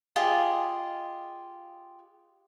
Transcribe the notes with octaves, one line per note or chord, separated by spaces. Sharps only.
F4 G4 G#4 D#5